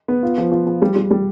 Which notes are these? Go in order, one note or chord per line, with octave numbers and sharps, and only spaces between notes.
B3
F4
F3
F3
F3
G3
G3
G3